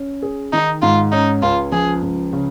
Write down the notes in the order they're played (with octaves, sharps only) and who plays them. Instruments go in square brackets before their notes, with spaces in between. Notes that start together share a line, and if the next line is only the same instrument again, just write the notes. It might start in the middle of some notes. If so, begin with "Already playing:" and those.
Already playing: [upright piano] C#4
G#4
[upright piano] D#3 [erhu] D#4
[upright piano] G#2 [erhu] F4
[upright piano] C#4 [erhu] D#4
[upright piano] C#2 [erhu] F4
[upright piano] F3 [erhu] G#4
[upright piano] C#2
C#3